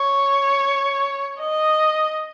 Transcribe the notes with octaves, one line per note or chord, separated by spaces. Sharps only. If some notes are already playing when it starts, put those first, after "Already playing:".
Already playing: C#5
D#5